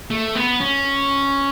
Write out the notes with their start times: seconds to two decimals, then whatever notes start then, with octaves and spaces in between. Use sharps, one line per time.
0.10 A3
0.35 B3
0.60 C#4